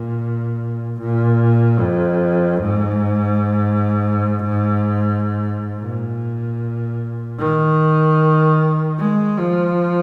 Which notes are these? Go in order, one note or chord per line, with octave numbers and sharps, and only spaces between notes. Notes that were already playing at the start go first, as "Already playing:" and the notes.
Already playing: A#2
A#2
F2
G#2
A#2
D#3
G#3
F3